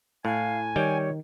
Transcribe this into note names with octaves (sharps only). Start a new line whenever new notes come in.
A2 F5 G#5
D#3 G3 C#5 G5